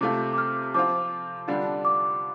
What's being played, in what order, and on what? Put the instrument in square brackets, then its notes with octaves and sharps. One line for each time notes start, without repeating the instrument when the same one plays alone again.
[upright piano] C3 A3 F4 [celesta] D6
[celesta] D6
F6
[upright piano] F3 C4 F4 [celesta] D6
[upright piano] D3 G3 D4 F4
[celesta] D6